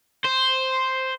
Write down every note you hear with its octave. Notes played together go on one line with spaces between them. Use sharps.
C5